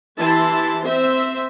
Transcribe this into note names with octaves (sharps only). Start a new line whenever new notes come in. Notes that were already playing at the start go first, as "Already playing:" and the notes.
E3 E4 G4 A5 C6
C4 C5 E5